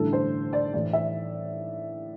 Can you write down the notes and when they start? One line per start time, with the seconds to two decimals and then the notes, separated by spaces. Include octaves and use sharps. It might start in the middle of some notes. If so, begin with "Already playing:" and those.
Already playing: A1 G2 D3 A3 E4 A4
0.13 C5
0.53 D5
0.73 A2 E3 A3 D5
0.93 E5